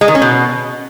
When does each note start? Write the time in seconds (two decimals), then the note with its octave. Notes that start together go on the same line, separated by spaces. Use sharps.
0.01 G#3
0.08 D#3
0.15 C#4
0.22 B2